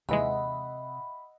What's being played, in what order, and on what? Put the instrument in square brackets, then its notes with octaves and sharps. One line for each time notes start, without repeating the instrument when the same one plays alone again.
[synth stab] D#2 E3 G#3 [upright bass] C3 [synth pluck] D#5 E5 F#5 [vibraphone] B5